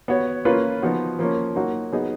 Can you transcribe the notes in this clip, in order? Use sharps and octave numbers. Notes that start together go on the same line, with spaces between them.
B3 F#4 C#5
A#3 C#4 F4 B4
F3 B3 D#4 F#4
F3 A#3 C#4
F#3 A#3 D#4 F#4
F#3 B3 D#4 G#4 D#5